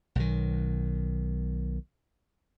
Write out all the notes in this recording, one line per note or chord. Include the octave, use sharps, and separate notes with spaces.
B1 D#3